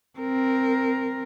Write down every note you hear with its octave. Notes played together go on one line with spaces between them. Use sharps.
C4 A#4